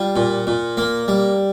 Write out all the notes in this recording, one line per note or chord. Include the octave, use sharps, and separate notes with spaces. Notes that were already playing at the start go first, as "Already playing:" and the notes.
Already playing: G3 F4
A#2
A#2
A#3
G3